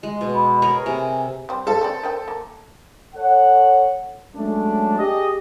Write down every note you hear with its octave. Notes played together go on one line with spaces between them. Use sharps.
G#3 D#5
B2
B5
G#4 A#4 C#5
C3 G#5
G3 C4
A#3 A4 E5 F5
D#3 C4 D5
A#4 C5 G5
A#3
A4 C#5 F#5
F#3 G#3 A3 C#4 D4
G4 G#4 D#5